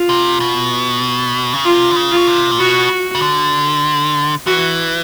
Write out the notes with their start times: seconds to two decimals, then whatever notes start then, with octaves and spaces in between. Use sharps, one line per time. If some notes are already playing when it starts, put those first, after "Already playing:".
Already playing: F4
0.09 C3
0.40 B2
1.53 C#3
1.65 C3 F4
1.91 D3
1.96 C#3
2.12 F4
2.17 B2
2.27 C3
2.51 A#2
2.59 B2 F#4
3.15 C#3
3.22 D3
4.46 E3 F#4